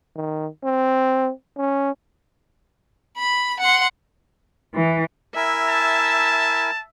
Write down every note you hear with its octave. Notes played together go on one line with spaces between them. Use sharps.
D#3
C4
C#4
B5
F#5 C6
E3
E4 A#4 E5 G#5
A5